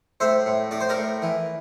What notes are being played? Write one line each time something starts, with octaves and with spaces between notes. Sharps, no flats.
A2 C5 E5
A2
A2 D5
C5
A#4 D5
A2
E3